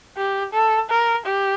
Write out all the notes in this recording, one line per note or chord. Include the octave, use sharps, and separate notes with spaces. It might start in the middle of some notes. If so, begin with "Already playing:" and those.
G4
A4
A#4
G4